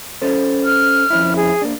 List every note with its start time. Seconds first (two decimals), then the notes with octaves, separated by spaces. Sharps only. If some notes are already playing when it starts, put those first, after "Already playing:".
0.22 C#4 A4 C5
0.65 F6
1.10 F2 C#4 E4
1.36 G#4
1.62 A#3 D4